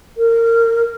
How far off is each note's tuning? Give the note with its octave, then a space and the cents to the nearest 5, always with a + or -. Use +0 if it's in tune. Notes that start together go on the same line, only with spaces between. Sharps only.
A#4 -25